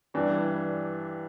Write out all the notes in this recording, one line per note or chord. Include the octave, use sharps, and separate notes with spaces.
G2 E3 G3 D4